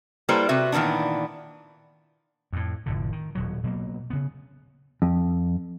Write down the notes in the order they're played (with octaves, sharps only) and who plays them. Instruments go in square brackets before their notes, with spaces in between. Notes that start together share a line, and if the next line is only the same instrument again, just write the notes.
[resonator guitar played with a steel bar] G3 A#3 E4 A4 B4 C5
C3 F#4 B4 E5
A#2 D#3 E3 B3 D4
[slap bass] F2 A2
F1 A2 D3
D#3
D#1 B2 F#3
B2 F#3 A#3
C#3 B3
[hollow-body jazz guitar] F2